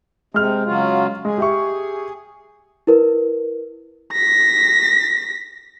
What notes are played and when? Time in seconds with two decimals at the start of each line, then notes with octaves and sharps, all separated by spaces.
0.34 C3 G#3 F6
0.66 C#3 F#3 F4
1.25 G#3 G#4
1.38 G4 E5 C#6
2.87 E4 A#4 B4
4.12 A#6 B6